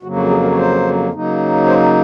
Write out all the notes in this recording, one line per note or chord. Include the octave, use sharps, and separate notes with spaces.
F2 C#3 F#3 A#3 F#4
F#4
G#4
A#4
C#5
C5
C#3 F#3 A#3 D#4
C5